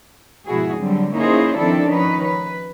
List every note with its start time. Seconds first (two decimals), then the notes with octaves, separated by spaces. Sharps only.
0.47 G#2 B2 F3 E4 F#4 G#4
0.79 D3 F#3 G3 C4
1.15 A#3 C#4 D#4 E4 G#4 C5
1.59 D#3 F3 C4 D4 E4 A4
1.88 D#3 F3 C#4 D#4 B4
2.24 B4